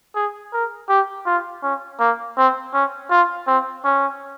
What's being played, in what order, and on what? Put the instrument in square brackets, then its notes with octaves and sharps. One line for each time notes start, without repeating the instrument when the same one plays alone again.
[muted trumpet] G#4
A#4
G4
F4
C#4
A#3
C4
C#4
F4
C4
C#4